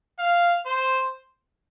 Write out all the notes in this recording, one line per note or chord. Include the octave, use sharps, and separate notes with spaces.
F5
C5